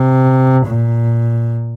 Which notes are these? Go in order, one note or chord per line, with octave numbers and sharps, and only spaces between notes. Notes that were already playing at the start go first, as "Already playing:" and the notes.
Already playing: C3
A#2